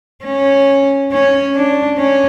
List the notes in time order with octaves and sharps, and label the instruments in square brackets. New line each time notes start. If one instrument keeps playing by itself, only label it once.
[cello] C#4
C#4
D4
C#4